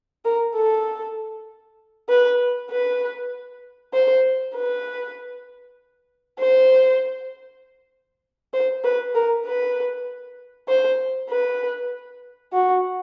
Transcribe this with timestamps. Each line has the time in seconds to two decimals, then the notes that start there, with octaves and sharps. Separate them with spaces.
0.25 A#4
0.56 A4
2.09 B4
2.71 B4
3.94 C5
4.55 B4
6.39 C5
8.54 C5
8.84 B4
9.15 A#4
9.46 B4
10.68 C5
11.30 B4
12.53 F#4